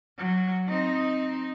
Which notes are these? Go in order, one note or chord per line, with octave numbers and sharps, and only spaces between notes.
F#3
C4 D#4